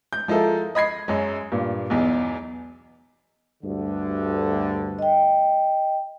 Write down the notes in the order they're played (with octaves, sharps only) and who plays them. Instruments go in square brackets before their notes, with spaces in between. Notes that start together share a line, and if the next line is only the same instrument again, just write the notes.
[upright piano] G6
F3 G#3 E4 A4 A#4
D#5 B5 G#6 C7
F#2 F#3 G#3
G2 A#2
B1 E2
[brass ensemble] D2 G2 D3
[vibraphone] D#5 G5